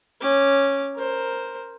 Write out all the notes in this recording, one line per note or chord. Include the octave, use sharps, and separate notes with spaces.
C#4 D6
A#4 C5